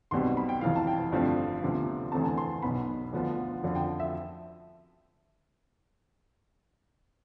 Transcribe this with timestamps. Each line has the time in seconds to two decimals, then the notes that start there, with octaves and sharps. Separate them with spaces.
0.11 B1 B2 G3 C4 C6
0.37 B5
0.49 G5
0.61 F1 F2 E3 F5
0.76 A5
0.87 G5
1.12 G1 G2 F3 A3 C4
1.62 D2 C3 F3 B3
2.12 E2 D3 A3 C4 A5
2.24 A5
2.37 C6
2.62 B1 B2 B3 B5
3.13 D2 D3 F3 B3
3.63 F2 D3 F3
3.75 G5
4.00 E5